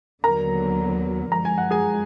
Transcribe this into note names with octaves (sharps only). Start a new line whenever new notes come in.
D#2 D3 F#3 B3 A#4 A#5
F#2 F3 G#3 A#5
G#5
F#5
G#4 G#5